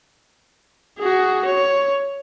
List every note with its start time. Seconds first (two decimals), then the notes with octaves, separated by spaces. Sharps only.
0.98 F#4 G#4
1.45 C#5